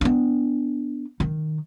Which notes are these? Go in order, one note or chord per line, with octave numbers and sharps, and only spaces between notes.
B3 D4
D#3